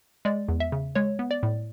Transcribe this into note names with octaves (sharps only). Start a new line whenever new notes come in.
G#3 D5
E2
E5
C#3
G#3 C#5
B3
D5
A2